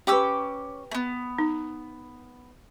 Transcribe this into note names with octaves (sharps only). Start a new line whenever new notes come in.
C#4 G4 B4 D6 E6
A3 B3
D#4